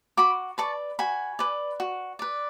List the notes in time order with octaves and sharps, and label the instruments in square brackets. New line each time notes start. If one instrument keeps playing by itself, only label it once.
[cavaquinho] F#4 B5 D6
B4 D5 A5 C#6
F#4 G#5 B5
B4 D5
F#4
B4 D5